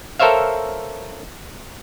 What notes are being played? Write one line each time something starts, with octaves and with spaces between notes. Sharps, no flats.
A4 A#4 C5 C#5 E5 F5